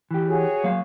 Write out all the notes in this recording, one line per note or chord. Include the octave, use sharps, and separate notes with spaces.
E3 G4
F#4 G#4 C#5
F#3 A#3 F5